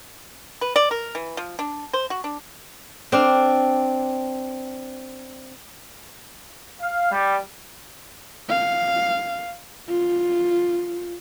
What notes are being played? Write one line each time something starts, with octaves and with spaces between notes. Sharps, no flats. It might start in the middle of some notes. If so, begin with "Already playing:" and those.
B4
D5
A#4
E3
F3
D4
C5
F#4
D4
C4 D4 F5
F5
G3
F5
F4